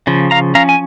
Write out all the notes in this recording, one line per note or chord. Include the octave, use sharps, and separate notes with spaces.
C#3 F3
F5 A#5
F3 C#4 F5 A#5
G#5